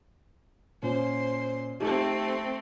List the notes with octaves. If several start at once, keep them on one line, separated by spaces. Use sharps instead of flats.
A#2 C#4 C5
A3 C4 D#4 G4